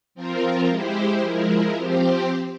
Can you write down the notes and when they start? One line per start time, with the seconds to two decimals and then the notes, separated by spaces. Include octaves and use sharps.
0.15 F3 C4 F4 A#4
0.68 G#3 E4 G4 C5
1.21 F3 G#3 E4 A#4
1.76 F3 C4 G4 C5